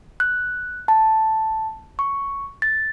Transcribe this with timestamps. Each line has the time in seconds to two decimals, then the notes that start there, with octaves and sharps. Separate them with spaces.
0.20 F#6
0.88 A5
1.99 C#6
2.62 A6